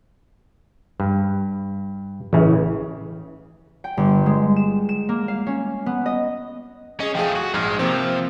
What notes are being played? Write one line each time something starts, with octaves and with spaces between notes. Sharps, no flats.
G2
A1 C#3 E3
G5
G1
G#3
E7
E7
A#3
F5
C#4
B3
D#5
C#4 G#4 D#5
F3 A3 G#4 F5 G5
F#4
A#1 G#2 G#3 F6
C3 F3 A#3 C4